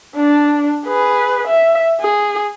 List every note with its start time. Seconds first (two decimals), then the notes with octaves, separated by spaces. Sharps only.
0.16 D4
0.86 G#4 B4
1.47 E5
2.01 G#4